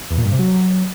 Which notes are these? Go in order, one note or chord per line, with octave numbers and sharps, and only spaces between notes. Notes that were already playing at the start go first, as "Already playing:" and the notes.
E2
A#2
G2
C3
F#3